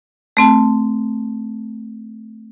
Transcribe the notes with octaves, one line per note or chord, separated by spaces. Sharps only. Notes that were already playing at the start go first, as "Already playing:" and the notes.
A3 C4 A5